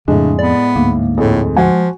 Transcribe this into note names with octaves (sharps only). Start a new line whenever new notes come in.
F2 A2 C#3 G#3 D4
B3 D5
D2 G#2 A#3
F2 A2 G#3 A4
F3 G#3 F#4 F#5 G#5